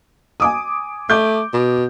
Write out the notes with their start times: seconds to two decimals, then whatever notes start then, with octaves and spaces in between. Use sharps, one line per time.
0.40 G#5 D6 D#6
1.10 A3 D6 G6
1.53 B2